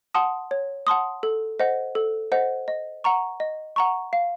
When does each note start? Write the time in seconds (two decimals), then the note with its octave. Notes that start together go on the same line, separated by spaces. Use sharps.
0.14 F#5 A5 C6 D#6
0.51 C#5
0.87 F#5 A5 C6 D#6
1.23 A4
1.60 C5 D#5 F#5
1.95 A4
2.32 C5 D#5 F#5
2.68 D#5
3.04 F#5 A#5 C#6
3.40 D#5
3.76 F#5 A#5 C#6
4.13 F5